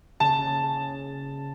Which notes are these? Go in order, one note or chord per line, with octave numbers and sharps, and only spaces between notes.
C#3 A5
C#3